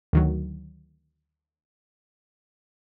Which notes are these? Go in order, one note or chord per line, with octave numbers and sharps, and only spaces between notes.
D2 D#3 F#3